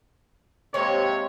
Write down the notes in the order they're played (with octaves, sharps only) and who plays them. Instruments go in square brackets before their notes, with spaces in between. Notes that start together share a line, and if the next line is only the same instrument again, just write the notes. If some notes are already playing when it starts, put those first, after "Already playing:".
[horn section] C3 C#5 [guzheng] G#3 A#3